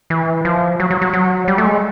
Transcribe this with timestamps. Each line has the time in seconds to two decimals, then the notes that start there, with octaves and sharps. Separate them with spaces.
0.10 E3
0.45 F3
0.80 F#3
0.91 F#3
1.01 F#3
1.14 F#3
1.48 G3
1.58 A3
1.65 G#3